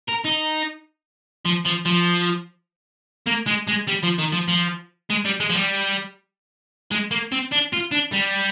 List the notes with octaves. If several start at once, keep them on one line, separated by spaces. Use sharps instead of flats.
A#4
D#4
F3
F3
F3
A#3
G#3
G#3
G3
F3
D#3
F3
F3
G#3
G3
G#3
F3
G3
G#3
A#3
C4
D4
F4
D4
G3